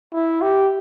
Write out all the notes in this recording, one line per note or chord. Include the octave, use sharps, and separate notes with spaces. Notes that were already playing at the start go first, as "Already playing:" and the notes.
E4
G4